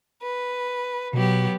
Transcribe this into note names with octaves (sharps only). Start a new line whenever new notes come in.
B4
B2 F#3 B3 G4